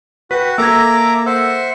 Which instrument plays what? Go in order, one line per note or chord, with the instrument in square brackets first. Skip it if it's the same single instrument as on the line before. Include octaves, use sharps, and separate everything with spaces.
[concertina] F#4 [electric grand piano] B4 G5 [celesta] B6
[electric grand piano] A#3 A4 A#6 [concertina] E5 A#5 D6 [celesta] E6 G#6
[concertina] C5 E5 F#5 [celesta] E6